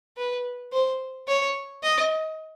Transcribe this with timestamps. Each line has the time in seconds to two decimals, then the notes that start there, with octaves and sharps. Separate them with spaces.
0.17 B4
0.72 C5
1.28 C#5
1.83 D#5